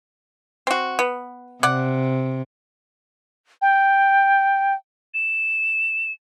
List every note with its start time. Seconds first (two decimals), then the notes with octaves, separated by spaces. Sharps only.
0.67 C4 F#4
0.99 B3
1.63 C3 D5 F#5
3.62 G5
5.14 E7